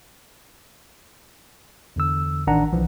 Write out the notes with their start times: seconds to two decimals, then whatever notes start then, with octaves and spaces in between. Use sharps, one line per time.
1.96 E2 D3 E6
2.47 A1 D#3 D4 F#5 A#5
2.73 B1 E3 F3